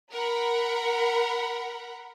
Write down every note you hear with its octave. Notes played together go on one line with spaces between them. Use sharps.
A#4 F#5 A#5 B5